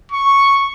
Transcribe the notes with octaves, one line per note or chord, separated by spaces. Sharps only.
C#6